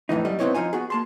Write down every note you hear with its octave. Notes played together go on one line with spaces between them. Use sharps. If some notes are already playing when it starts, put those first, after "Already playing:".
F2 A2 E3 D#4
F#2 G3 D#5
G#2 B3 C4 E4 C#5 D#5
F3 A#3 D#4 F4 D#5 G#5
B3 F#4 G#4
A#3 A5 C6